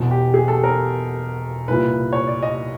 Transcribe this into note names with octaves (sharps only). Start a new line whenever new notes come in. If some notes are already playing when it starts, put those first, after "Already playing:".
Already playing: E1 E2 B2
G4
G#4
A4
A#4
C2 A#2 B4
C#5
D5
D#5